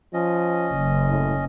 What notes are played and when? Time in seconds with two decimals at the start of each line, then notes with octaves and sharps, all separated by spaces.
0.14 F3 C#4 D#5
0.72 F#1
1.10 A2